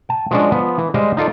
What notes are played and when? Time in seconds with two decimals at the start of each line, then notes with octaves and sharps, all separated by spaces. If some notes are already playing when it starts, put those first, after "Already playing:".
0.09 G5 A5
0.31 F3 F#3 G#3 C#4 D4 F#4
0.52 F3 B3
0.78 E3
0.94 G3 G#3 G4 C5 D#5 F5
1.17 D#4 F4 A4 D5